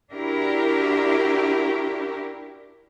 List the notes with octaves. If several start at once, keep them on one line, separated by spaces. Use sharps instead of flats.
D4 E4 F#4 G4 A#4